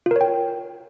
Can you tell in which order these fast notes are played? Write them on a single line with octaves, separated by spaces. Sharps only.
F4 A#4 C#5 G5